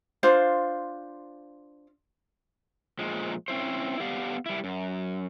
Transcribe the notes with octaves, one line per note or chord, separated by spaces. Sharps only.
D4 F4 C5 F5
A#2 F3 G#3
C4 C#4 E4 C5
B3 G4 D5 F5
G3 E4
F#2